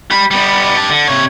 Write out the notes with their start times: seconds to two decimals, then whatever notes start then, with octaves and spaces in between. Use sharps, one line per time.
0.11 G4 B5
0.31 G3 B3
0.76 G4 A5
0.90 D3
1.08 C3 C#5